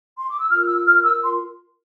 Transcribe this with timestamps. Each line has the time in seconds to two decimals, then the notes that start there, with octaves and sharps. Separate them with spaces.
0.19 C6
0.30 D6
0.40 E6
0.50 F4 A#4 F6
0.68 E6
0.86 F6
1.04 E6
1.22 C6